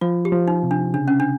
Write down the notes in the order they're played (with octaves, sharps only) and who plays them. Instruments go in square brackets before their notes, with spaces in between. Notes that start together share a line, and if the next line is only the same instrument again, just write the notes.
[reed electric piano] F3 [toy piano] F4
[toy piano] G4
[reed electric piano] F3
[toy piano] D#4
[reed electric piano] C3
[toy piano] D4
[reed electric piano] C#3 [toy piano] D4
[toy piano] C#4
D4